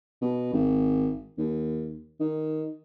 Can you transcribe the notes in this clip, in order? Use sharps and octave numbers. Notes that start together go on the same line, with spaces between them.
B2
G#1
D#2
D#3